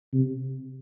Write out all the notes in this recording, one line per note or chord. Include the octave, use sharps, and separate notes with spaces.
C3